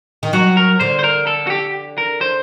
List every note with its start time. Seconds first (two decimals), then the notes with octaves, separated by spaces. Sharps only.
0.23 D#3
0.33 F#3 F#4
0.57 A#4
0.80 D3 C5
0.99 C5
1.04 A#4
1.27 A4
1.47 F#4
1.50 G4
1.98 A#4
2.21 C5